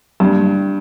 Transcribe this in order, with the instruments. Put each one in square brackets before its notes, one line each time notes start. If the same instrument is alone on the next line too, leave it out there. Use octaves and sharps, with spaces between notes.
[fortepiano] G2